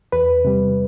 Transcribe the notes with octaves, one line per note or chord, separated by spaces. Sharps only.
E2 B4
C3 G3